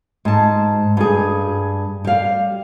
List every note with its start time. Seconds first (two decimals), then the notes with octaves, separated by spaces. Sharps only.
0.25 G#2 A5
0.97 G2 G#4
2.05 G3 F5